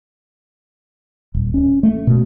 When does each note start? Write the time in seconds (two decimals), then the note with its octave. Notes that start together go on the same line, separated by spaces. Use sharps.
1.34 D#1
1.54 C#4
1.83 A3
2.07 B2